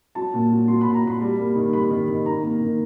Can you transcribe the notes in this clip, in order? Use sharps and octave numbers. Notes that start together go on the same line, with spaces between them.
F#3 A5
A#2
F#3
F#3 C6
B5
A#2
A#5
A#2 B5
G3
A#3
D#3
G3 B5
D#3
D#3
D#3 A#5
A#3
D#3